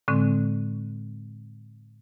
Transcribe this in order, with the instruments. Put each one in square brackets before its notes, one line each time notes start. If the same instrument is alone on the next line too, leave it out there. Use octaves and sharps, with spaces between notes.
[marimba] A2 D3 G#3 C4